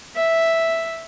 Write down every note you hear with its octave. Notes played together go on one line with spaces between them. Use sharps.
E5